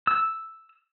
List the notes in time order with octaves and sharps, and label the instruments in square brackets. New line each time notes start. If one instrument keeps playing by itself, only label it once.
[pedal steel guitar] E6